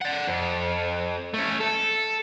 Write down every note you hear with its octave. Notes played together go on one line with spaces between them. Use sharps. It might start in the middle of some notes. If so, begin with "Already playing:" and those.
D5 F#5
F2
A3 C#4
A4